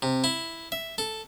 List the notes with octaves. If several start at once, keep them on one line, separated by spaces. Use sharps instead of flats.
C3
E4
E5
A4